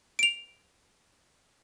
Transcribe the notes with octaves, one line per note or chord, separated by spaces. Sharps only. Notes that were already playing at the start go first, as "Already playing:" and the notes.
D7 F7